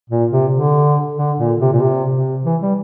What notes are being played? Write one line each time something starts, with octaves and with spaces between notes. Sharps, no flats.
A#2
C3
D3
D3
A#2
C3
A#2
C3
C3
E3
G3